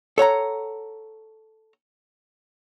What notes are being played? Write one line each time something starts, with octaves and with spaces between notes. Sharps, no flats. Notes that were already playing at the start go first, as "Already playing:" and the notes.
A4 C#5 F#5 A#5